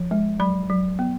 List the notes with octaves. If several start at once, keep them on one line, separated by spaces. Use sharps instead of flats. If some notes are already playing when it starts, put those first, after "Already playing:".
Already playing: F3
G#3
F#3 B5
F#3
B3